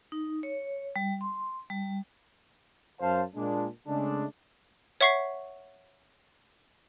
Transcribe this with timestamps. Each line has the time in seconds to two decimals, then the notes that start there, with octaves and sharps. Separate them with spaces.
0.12 D#4
0.43 C#5
0.96 G3
1.21 C6
1.70 G3
3.00 F#2 C5 F5 A5
3.35 A#2 G#3 D4
3.87 C#3 G#3 A3 D4
5.01 C#5 E5 F#5 C#6 B6 C7